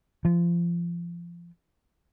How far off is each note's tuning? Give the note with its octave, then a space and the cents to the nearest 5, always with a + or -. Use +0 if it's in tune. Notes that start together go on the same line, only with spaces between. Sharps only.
F3 -25